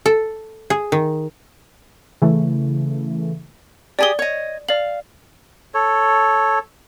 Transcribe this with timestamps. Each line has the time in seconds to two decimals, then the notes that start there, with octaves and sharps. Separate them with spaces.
0.06 A4
0.70 G#4
0.92 D#3
2.22 C#3 E3 A3
3.99 G4 G#4 D5 D#6 G7
4.19 C#5 D#5
4.69 D5 F5 F#7
5.74 A4 C#5